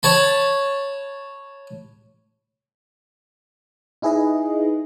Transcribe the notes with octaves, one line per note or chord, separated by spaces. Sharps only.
C#5 A5 B5
D#4 E4 G#4 B4 D#5